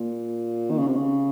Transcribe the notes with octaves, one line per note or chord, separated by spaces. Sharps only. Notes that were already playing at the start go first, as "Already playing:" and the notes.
Already playing: A#2
D#3
C#3
C3
C#3